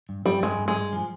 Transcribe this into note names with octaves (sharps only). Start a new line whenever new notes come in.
G2
G2 G3
G2 G#3
G2
G#3
G2
F3